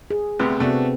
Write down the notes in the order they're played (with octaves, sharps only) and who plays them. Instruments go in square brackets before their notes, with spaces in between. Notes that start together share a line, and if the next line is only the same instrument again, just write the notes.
[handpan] G#4
[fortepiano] D2 C3 B3
[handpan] C3 B3 C4 [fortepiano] A3 D4 F#4